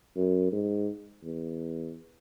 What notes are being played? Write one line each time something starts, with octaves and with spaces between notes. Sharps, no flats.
F#2
G#2
E2